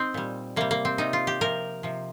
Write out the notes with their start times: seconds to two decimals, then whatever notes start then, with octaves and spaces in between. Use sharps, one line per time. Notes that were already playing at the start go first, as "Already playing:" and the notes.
Already playing: C4 D#4
0.14 A#2 G3
0.56 C3 G3 A#3
0.71 A#3
0.85 C4
0.98 C3 G3 D#4
1.13 F4
1.27 G4
1.41 C3 F3 A#4
1.83 C3 F3